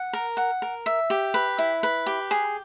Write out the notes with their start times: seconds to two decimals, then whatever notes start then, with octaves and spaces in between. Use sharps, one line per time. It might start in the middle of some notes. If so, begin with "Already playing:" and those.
Already playing: F#5
0.13 A#4
0.37 F#5
0.62 A#4
0.86 E5
1.10 G4
1.34 B4
1.58 E4
1.83 B4
2.06 G4
2.31 G#4